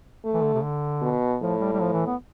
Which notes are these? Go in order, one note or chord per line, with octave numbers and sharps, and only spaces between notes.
A3
E3
D3
C3
D3
B2
A2 F3
G3
G3
F3
E3
B3